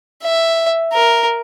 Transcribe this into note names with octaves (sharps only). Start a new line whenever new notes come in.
E5
A#4